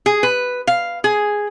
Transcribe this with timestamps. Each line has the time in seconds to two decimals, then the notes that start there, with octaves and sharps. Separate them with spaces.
0.06 G#4
0.23 B4
0.67 F5
1.04 G#4